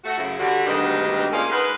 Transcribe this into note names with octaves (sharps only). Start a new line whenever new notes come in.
A3 F#4
F#2 C#3 E4
D3 G3 F#4
D2 G2 B2 D#3 G#3 G4
A#3 C#4 D#4 F4 G#4 D5
G#3 D#4 A#4 B4